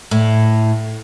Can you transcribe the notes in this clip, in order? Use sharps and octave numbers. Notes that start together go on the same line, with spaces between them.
A2